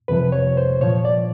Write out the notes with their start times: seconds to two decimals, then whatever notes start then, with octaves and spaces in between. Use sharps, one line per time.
0.08 F2 C3 F3 B4
0.32 C#5
0.57 C5
0.81 A#2 F3 C#5
1.05 D5